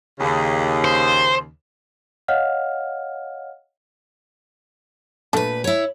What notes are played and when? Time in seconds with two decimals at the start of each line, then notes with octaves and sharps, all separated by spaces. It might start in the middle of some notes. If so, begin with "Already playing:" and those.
0.20 D#2 C#3
0.84 C5
2.28 C#5 D#5 F5 F#5 F6
5.33 A#2 A3 D4 B4 A5
5.64 E4 C#5